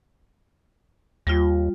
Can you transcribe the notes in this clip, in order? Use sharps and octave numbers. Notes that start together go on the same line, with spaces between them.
D#2 G3 F4